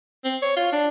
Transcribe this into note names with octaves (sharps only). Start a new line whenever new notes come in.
C4
C#5
F4
D4